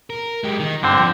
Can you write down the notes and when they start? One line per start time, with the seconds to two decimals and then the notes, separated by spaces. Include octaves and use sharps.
0.10 A#4
0.44 G#3 G4
0.59 D#3 D#4
0.83 G2 D3 C4 D4
0.98 F3